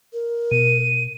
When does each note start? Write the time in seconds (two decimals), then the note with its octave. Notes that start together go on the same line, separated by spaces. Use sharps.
0.13 A#4
0.51 B2 D#7